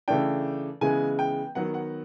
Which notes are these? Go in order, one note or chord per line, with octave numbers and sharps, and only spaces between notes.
C#3 E3 A3 D4 G5
C#3 E3 G#3 B3 G#5
G5
D#3 F#3 B3 F#5
F#5